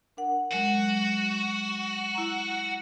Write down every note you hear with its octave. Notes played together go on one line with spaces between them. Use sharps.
D4 A#4 F#5
F#3 G#3 F#4
E4 A#5